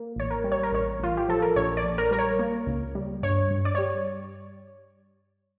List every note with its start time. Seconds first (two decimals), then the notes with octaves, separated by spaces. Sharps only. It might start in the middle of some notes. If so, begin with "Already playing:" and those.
Already playing: A#3
0.16 A1 C#5
0.31 A#4
0.44 G3
0.52 C#5
0.63 A#4
0.72 A1 C#5
1.00 A1 F4
1.17 G4
1.29 F3 A4
1.42 A#4
1.56 A#1 C#5
1.77 D5
1.83 A#1
1.98 A#4
2.11 G3 A#4
2.19 C#5
2.39 A#3
2.67 C#2
2.95 G3
3.23 G2 C#5
3.51 G2
3.65 D5
3.75 G3 C#5